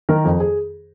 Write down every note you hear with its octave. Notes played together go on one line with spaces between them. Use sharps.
D#3 A#4
F2
G#4